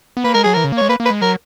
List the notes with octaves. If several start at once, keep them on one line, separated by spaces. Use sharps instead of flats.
B3
A#3 B4
G#3 A#4
F#3 G#4
E3 A#4
C#3
A#3
G#3 C#5
A#3 B4
A#3
B4
G#3
F#3 A#4